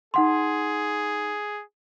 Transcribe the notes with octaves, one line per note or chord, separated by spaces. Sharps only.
D#4 G#4 F#5 C6